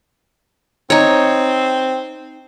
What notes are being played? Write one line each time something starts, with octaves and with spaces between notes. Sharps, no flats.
C4 D#4 C#5